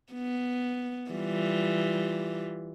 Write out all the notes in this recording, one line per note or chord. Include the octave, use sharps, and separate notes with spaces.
B3
E3 G3 F4